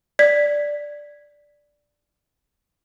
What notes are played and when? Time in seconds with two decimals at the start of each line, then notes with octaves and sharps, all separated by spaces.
0.19 D5 G#6 B6